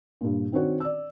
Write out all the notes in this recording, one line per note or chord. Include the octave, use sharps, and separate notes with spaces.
G2 A#2
D#3 C4 D4 F#4 C#5
D5 E6